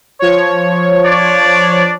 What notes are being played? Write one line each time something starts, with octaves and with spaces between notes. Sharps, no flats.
F3 C#5
D4 D5